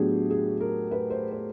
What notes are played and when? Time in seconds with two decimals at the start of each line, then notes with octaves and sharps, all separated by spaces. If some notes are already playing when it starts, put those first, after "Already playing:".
Already playing: A2 F#3 B3 D4 G4 G#4
0.30 G#4
0.60 A#4
0.91 B4
1.10 C5
1.31 C5